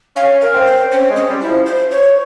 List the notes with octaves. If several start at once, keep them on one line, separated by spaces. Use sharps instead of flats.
C#4 F5
A#4
C4
C5
C4 C#4
G#3
C#4
G3
E4
F3
C5
C#5